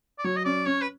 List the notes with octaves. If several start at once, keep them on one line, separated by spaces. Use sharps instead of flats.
D5
F#3 C#5
D#5
C#4 D5
C#4 C#5
B4